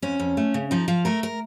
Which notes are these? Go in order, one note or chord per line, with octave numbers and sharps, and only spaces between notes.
F2 C#4
F2
A3
C#3
F3 D#4
F3 F4
A3 A#4
A#4